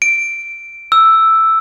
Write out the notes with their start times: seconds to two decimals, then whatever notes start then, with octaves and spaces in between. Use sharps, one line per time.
0.02 D7
0.92 E6